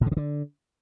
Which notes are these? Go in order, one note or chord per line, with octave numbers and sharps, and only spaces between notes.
A2
C3
C#3
D3